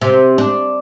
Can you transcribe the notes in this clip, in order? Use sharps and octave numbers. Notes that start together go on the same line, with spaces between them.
C3
D4